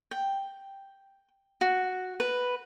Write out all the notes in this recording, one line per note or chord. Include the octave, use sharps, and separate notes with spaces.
G5
F#4
B4